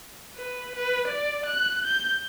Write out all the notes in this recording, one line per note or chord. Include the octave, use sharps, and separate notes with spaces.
B4
B4
D5
F#6
G6